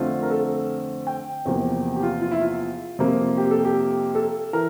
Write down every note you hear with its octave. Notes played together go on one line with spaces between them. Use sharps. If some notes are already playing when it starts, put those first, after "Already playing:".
Already playing: F2 D3 A3 C4 F4
A#4
A4
G5
E2 C3 F3 A#3
G4
F4
F4
E4
F4
F2 C3 F3 A#3
G4
A4
G4
A4
E3 A#4